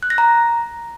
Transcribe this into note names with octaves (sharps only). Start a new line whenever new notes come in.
F#6
A#6
A#5